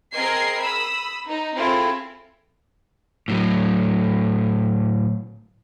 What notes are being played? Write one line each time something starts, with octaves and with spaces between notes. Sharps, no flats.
C4 G#4 A#4 D#5 G#6 C7
B5 D#6 E6
D#4
C4 E4 F4 G#4 A4
A2 F#3